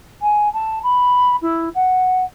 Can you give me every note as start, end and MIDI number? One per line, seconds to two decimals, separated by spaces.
0.22 0.52 80
0.53 0.79 81
0.83 1.36 83
1.42 1.69 64
1.75 2.24 78